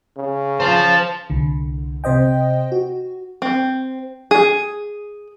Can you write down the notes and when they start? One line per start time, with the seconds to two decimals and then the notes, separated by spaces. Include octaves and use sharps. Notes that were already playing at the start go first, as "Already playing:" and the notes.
0.17 C#3
0.60 C5 F5 A5
1.30 C2 D3
2.04 C3 C5 D#5 G5
2.72 F#4
3.42 C4
4.31 G#4